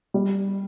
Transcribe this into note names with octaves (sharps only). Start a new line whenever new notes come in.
G3